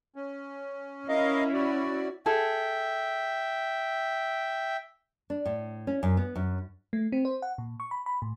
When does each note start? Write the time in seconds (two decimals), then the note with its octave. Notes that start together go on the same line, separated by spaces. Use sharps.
0.16 C#4
1.09 C#4 E4 A#4 D#5 F5
1.53 F#4 D5
2.26 G#4 A4 E5 G5
5.30 D4
5.45 A2
5.87 C#4
6.03 F#2
6.17 B3
6.35 F#2
6.93 A3
7.12 C4
7.25 C5
7.42 F#5
7.58 A#2
7.80 C#6
7.91 B5
8.06 B5
8.22 A2